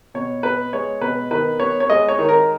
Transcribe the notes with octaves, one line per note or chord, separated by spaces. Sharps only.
B2 C#5
B3 B4
G#3 C#5
B2 B4
D#3 B4
B3 C#5
C#5
G#3 D#5
C#5
D#3
A#4